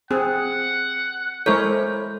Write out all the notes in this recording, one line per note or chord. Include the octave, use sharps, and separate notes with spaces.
C4 G#4 F#5
G#3 E4 A4 A#4 C5 C#5 G6